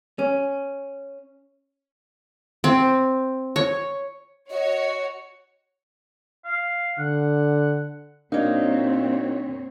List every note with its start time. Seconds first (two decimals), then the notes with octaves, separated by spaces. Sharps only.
0.19 C#4
2.64 C4
3.56 C#5
4.50 F#4 C#5 D#5 C#7
6.45 F5
6.98 D3 F#5
8.32 A#2 F#3 A#3 C4 D4 D#4 C#5